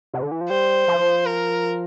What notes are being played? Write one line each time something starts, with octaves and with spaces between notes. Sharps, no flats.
C3
D3
E3
F3
G3 C5
F3
A#4